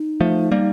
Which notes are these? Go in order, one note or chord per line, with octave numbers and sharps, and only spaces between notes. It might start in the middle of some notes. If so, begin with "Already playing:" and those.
Already playing: D#4
F3 A3
G3 A#3